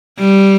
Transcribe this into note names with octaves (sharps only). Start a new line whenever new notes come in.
G3